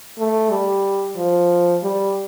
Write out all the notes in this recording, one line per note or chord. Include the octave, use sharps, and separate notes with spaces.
A3
G3
F3
G3